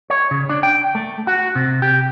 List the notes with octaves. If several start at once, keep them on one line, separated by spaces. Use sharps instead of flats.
C#5
C#3
D4
G5
A3
F#4
C3
G4